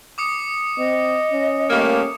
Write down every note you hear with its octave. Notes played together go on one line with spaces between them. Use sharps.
D6 D#6 C#7
C4 D#5
C#4
G3 A3 A#3